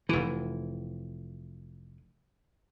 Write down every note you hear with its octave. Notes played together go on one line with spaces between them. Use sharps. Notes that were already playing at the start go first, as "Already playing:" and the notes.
F1 E3